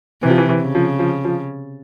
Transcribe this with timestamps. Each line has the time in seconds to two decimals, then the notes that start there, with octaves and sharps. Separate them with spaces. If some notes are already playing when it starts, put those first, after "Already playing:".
0.23 C3 E3
0.30 F3
0.38 E3
0.49 E3
0.62 C#3
0.75 F3
0.99 F3
1.25 F3